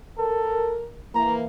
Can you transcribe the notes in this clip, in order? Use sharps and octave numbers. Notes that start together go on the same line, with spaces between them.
A4 A#4
E3 A#3 A#5